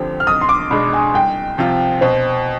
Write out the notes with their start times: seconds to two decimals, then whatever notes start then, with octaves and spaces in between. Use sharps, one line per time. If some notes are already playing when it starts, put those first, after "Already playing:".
Already playing: D2 D3 F3 C4 G4
0.20 F6
0.27 B1 D#6
0.41 C6
0.49 D6
0.70 B2 G#3 D4 B5
0.93 G#5
1.14 C2 G5
1.58 C3 F3 C4 F4
2.01 B2 C5